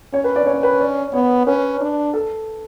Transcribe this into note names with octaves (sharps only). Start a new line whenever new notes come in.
C#4 C#5
B4
D5
C#4 C#5
B4
D5
B3 C#5
C#4 B4
D4
A4